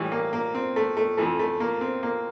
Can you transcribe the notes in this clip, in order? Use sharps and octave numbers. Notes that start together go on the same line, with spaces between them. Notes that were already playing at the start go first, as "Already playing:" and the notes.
Already playing: A2 E3 G3
A#3
A#3
C4
A3
A3
F2 E3 A3
A3
A#3
C4
A#3